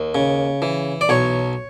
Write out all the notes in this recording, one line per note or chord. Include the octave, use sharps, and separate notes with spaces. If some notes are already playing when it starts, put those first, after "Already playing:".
Already playing: D#2
C#3
E3
D5
B1 C#5